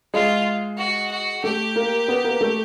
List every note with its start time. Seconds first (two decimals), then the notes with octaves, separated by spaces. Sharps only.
0.14 G#3 F4
0.78 F#4
1.11 F#4
1.44 A3 G4
1.76 A#3
2.08 B3
2.24 A#3
2.41 A3